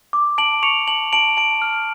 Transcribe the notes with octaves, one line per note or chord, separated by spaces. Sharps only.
D6
A5 D7 F#7
C#6 C#7 F7
A5 F#7
A5 D7 F#7
A5 D7 F#7
F6